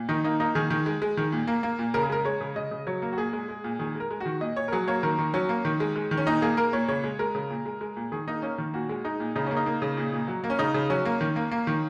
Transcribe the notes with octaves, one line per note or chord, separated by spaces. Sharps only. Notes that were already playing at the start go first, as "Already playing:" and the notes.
Already playing: A#2
D#3 D#4
A#3 D#4
A#3 D#4
D#3 G#4
D#3
G#3
G#3
D#3
A#2
A#3
A#3
A#2
C#3 A#4
G#4
G#3 A#4
G#3 C#5
C#3
C#3 D#5
C#3
F#3 C#5
A#3
F#4
A#2 G#4
G#3
G#3
A#2
D#3 G#4
G#3
A#4
G#3
F#4
D#3
A#2 D#5
A#2 C#5
A#4
F#3 G#4
A#3 C#5
D#3 A#4
D#3
F#3 C#4
A#3
D#3
G#3
G#3
D#3
C#4
A#2 D#4
A#3 G#4
A#3 A#4
A#2 C#5
C#3 C#5
G#3
G#3 A#4
C#3
A#2
G#3
G#3
A#2
D#3 G#4
A#3 D#4
A#3 C#4
D#3
A#2 F#4
G#3
G#3 D#4
A#2
C#3 D#4
A#3 C#4
D#4
A#3
C#3
A#2
A#2
F#3
A#3
C#4
C#3 D#4
C#3
F#3 C#4
A#3
D#3
A#3
A#3
D#3